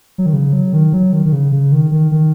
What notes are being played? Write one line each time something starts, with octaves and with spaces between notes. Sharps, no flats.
F#3
D#3
C#3
F#3
D#3
F#3
D#3
D#3
C#3
C#3
D#3
D#3
D#3